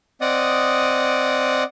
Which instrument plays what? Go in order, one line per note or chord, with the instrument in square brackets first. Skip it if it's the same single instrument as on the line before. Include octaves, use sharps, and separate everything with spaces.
[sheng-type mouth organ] C4 D5 D#5 F#5 D#6